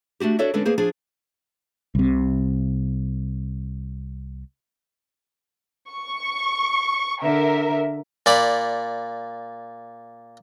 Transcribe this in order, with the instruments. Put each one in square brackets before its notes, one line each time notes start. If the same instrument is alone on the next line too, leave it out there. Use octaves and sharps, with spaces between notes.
[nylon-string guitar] A3 D4 F#4 G4
D4 F#4 A4 C#5 D5 E5
D3 G#3 B3 C#4 D4 A4
A#3 B3 G#4 C5
F3 D4 G#4
[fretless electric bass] C2 C3
[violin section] C#6
[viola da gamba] D3 [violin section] A#4 E5
[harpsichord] A#2 D5 B5